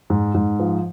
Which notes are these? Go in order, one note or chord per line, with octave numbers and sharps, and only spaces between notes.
G#2
G#2
F3